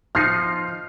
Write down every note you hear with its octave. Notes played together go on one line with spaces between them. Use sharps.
F3 D#4 F6 C7